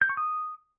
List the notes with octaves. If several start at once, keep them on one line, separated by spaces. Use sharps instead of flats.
G6
C#6
D#6